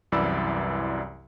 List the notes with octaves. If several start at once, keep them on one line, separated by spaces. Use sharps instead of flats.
C2 F#2 E3 D5 B5 E6